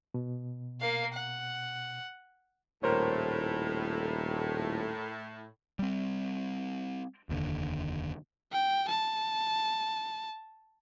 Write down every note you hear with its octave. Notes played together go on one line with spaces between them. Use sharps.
B2
A#3 F5
F#5
D#1 A2 A#4 C5 C#5
G3 C4
F1 D#2 G#2 D3
G5
A5